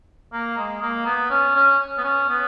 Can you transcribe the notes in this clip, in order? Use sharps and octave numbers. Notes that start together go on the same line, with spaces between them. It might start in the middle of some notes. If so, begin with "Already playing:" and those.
A#3
G#3
A#3
B3
C#4
C#4
B3
C#4
B3